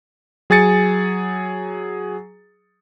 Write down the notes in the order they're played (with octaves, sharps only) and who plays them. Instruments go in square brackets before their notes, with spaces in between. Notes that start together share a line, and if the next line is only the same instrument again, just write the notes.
[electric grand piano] F#3 G#4 G#5 A6 C#7